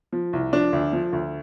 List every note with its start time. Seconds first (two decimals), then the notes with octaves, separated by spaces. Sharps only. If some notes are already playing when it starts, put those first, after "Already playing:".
0.13 F3
0.33 C2
0.53 F3 D4
0.73 D2
0.93 F3
1.13 D2